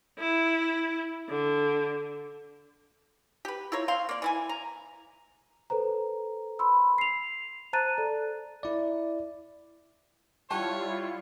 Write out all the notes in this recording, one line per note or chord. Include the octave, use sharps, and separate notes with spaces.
E4
D3
G4 B4
E4 F4 A#4 C#5
C4 F5 C6
A#3 D5
E3 E4 G#5
A#5
A4 B4 C5 A#5
B5 C6 E6
C7 F7
C5 A5 A#5 F#6 A6 D#7
A4 D5
E4 D5
G3 E4 F4 G4 C#5 F#5 A5 C#6